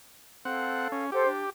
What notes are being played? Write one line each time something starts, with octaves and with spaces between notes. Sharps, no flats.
C4 A4 F5 F#5
C#4
G4 A4 C5 F#5
D4